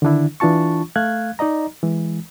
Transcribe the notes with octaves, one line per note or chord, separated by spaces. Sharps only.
D3 D#3 D4 E4
E3 D4 F4 A5 C#6
A3 F5 F#6 G#6
D#4 D5 D#5 A#5
E3 G#3